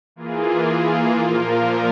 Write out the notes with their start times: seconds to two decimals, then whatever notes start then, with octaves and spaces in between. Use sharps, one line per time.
0.16 E3 A#3 F4 G#4
1.20 A#2 F3 A#3 F4 A#4